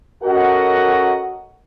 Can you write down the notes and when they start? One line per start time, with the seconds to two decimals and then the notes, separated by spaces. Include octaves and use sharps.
0.24 C#4 F#4 A4 A#4 D#5 F#5